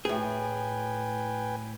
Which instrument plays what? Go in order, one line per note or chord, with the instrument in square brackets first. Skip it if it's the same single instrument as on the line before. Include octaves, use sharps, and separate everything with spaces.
[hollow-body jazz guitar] A2 G#4 [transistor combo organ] B4 G5 G#5